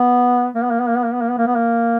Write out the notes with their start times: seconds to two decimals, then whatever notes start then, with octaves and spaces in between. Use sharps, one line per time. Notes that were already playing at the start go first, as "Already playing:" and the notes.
Already playing: B3
0.55 A#3
0.63 B3
0.71 A#3
0.80 B3
0.89 A#3
0.97 B3
1.05 A#3
1.13 B3
1.21 A#3
1.30 B3
1.38 A#3
1.46 B3
1.56 A#3